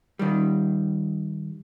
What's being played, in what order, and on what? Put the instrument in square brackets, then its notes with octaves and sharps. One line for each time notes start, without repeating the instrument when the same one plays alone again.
[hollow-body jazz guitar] D#3 G3